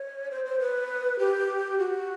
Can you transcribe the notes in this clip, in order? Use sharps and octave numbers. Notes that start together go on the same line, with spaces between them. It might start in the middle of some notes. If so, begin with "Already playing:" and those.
Already playing: C#5
C5
C5
B4
G4
F#4